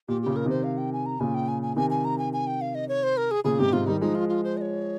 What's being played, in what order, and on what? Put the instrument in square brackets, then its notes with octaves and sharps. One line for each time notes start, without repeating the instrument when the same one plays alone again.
[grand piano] A#2 [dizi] G4
[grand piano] A#2 C#3 [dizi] G4
[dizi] A#4
[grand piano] C3 D#3 [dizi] C5
[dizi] F5
G5
G#5
A#5
[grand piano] A#2 C#3 [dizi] G#5
[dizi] G5
G#5
G#5
[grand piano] C3 D#3 [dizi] G#5
[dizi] G#5
A#5
G#5
G#5
G5
F5
D#5
C#5
C5
A#4
G#4
[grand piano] A#2 C#3 [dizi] G#4
[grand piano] G#2 C3 [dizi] G4
[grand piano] G#2 C3 [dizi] F4
[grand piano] D#3 G3 [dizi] D#4
[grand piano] F3 G#3 [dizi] D#4
[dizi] F4
F4
C5
D#5
C#5